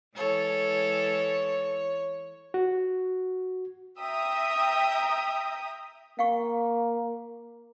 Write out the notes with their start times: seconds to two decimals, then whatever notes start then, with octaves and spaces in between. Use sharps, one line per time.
0.16 E3 G#3 A4 C#5
2.54 F#4
3.99 E5 G5 A#5 D#6
6.19 A#3 F5 G5 C#6